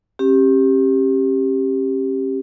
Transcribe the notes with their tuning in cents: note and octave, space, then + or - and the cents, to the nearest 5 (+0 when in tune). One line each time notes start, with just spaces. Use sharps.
C#4 -45 G4 +0